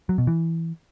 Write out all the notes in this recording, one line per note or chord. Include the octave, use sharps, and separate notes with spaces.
F#3
B2
E3